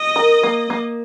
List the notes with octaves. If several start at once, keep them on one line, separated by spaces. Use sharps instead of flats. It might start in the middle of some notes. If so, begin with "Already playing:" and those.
Already playing: D#5
A#4
A#3
A#3